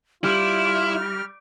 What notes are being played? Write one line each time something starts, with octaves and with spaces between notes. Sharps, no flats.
G3 E4 F4 F6